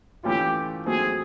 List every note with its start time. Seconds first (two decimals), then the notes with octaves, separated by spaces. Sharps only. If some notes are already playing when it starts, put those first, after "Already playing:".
0.23 E3 A3 C#4 F4 G4
0.86 F#3 A3 C4 G#4